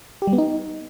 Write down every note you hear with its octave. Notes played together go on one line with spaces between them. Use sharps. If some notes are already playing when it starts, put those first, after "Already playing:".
G4
G3
B3
D#4